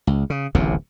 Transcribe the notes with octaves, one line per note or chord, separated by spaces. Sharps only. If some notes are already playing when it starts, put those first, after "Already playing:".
C#2
C#3
D1 A1 D#2 C3